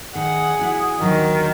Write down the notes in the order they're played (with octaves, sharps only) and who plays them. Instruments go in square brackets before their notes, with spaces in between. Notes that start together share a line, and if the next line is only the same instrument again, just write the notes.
[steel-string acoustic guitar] D#3 [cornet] G#4 [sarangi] F#5
[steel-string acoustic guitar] E4 F#4
[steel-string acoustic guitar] D#2 D3 F#3 [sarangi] D#3